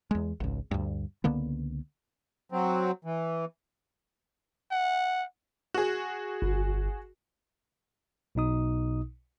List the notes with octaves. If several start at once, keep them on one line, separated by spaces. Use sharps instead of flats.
E2 G#3
G#1 C#2
D2 G2
C#2 D3 A#3 B3
F#3 C4
E3
F#5
F#4 G#4
G1
B1 B2 D#4 D#6